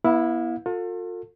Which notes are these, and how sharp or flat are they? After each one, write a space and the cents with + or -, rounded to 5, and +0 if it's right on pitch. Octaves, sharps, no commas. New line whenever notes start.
B3 -30 E4 +0 F5 +40
F4 +40 A4 +35